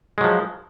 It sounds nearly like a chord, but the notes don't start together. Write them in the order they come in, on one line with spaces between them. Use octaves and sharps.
G#3 F#3 F3